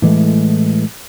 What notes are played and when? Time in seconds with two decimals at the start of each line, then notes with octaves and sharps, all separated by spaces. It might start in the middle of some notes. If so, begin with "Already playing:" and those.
0.02 A2 E3 G#3 A3